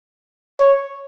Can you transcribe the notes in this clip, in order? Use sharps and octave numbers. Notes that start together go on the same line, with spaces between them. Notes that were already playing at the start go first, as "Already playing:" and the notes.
C#5